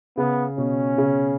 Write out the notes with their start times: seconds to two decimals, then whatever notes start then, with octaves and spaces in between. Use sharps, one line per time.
0.17 C#3 B3
0.57 B2 C#4
0.98 C#3